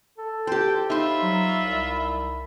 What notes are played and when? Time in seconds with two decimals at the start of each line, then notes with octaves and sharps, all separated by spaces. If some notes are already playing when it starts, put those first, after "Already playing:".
0.18 A4
0.47 G4 C5 G5
0.90 D#4 F4 E5 B5 C6
1.22 F#3
1.61 C2